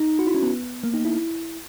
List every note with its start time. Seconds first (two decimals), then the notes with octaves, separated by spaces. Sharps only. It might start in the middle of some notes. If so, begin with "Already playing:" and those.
Already playing: D#4
0.19 F#4
0.27 E4
0.34 C#4
0.43 B3
0.83 A#3
0.94 D#4
1.05 E4